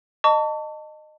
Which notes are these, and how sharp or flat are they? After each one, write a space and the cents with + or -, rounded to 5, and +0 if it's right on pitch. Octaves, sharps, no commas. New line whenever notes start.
D#5 -20 A5 +25 C#6 +40